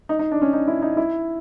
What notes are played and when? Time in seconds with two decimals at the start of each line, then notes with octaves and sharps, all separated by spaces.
0.09 D#4
0.19 D#4
0.32 D4
0.42 C#4
0.53 D#4
0.68 E4
0.82 D#4
0.97 E4